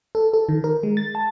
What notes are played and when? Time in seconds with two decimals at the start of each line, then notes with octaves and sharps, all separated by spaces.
0.15 A4
0.34 A4
0.49 D#3
0.64 A#4
0.83 G#3
0.97 A6
1.15 A5